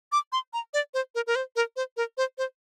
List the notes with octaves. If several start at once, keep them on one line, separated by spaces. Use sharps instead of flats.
D6
C6
A#5
D5
C5
A#4
A#4
C5
A#4
C5
A#4
C5
C5